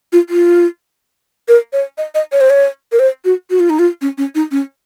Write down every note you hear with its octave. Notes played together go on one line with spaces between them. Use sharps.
F4
F4
A#4
C#5
D#5
D#5
C#5
C5
C#5
A#4
C5
F#4
F#4
F4
D#4
F4
C#4
C#4
D#4
C#4